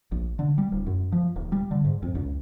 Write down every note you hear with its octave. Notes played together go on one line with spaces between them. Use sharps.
A#1
D3
G3
D1
F#2
F3
D#1
G3
D3
G#2
F2
C#2